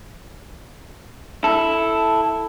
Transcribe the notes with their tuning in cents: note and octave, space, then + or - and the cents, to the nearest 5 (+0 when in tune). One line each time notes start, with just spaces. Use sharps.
E4 +0 A4 +0